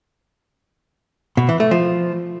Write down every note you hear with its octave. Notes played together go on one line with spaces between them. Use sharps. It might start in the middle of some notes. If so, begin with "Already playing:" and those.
B2
E3
A3
F3